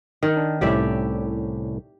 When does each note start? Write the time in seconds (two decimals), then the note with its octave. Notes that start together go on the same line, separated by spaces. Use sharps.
0.23 D#3
0.37 D4
0.61 C2 A2 C#4 G4 D5 E5